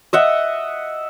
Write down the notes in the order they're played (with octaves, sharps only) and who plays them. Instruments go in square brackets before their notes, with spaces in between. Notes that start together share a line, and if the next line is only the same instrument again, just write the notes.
[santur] D#5 E5 F#5